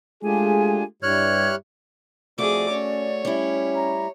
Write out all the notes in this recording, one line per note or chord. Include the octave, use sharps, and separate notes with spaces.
G#3 A3 D4 F4 G4 G#4 G#5
G2 G3 E4 G4 C#5 F6 F#6 G#6
F2 A3 F#4 G#4 D5 D6
C#4 C#5
G3 C#4 E4
A#5